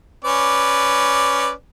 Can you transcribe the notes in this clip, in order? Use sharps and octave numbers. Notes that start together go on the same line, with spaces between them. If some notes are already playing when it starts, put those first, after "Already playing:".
C#4 B4 D5